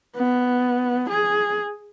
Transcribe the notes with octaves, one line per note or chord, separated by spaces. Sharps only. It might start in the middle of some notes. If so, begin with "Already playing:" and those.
B3
G#4